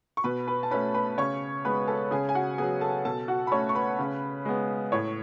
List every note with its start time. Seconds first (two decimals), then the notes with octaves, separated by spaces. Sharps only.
0.17 C#6
0.24 B2 B4 B5
0.47 B4 B5
0.63 A5
0.71 A3 C#4 B4 B5
0.94 B4 B5
1.18 C#3 C#5 C#6
1.65 G#3 B3 B4 B5
1.87 A4 A5
2.11 C#3 G#4 G#5
2.29 G#5
2.35 F#4 F#5
2.58 F#3 B3 G#4 G#5
2.81 A4 A5
3.05 B2 A4 A5
3.28 F#4 F#5
3.47 B5
3.52 A3 C#4 C#5 C#6
3.69 C#6
3.75 B4 B5
3.99 C#3
4.45 G#3 B3
4.92 A2 C#5 C#6